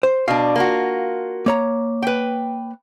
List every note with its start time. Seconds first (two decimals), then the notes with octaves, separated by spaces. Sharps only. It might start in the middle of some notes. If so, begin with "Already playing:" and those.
0.03 C5
0.28 B2 D4 F5
0.56 A#3 F4 F#4
1.46 A#3 C#5 A#5
2.02 B4 G5